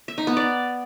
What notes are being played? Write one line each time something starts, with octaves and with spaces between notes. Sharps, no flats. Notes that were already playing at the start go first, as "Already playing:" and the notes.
E5
D#4
B3
D5